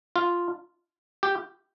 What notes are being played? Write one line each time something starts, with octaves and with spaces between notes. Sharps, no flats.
F4
G4